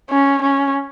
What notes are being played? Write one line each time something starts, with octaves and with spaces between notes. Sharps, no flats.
C#4
C#4